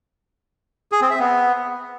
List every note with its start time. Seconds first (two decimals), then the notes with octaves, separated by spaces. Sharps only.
0.92 G#4
1.01 C4
1.10 E5
1.20 B3